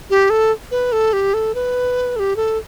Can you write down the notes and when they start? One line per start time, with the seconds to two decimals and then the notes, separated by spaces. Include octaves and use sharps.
0.10 G4
0.30 A4
0.71 B4
0.92 A4
1.13 G4
1.34 A4
1.55 B4
2.16 A4
2.19 G4
2.36 A4